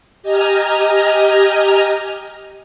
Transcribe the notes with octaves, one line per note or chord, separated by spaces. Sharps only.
G4 D#5 G#5 A#5 F6